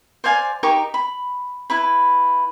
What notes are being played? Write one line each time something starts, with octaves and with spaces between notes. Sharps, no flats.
C5 D5 F5 G#5
D#4 G4 A#4 C#6
B5
E4 B4 B5